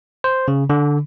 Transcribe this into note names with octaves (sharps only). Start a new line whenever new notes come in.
C5
C#3
D3